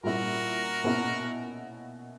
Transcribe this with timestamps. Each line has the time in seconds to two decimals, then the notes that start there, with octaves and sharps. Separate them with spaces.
0.03 A#2 G3 C#4 E4 F#4 A#4
0.84 B2 A#3 C#4 E4